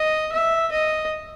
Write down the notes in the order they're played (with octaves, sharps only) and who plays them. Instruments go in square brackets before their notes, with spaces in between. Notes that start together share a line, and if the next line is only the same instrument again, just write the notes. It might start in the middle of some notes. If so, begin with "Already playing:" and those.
Already playing: [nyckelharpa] D#5
E5
D#5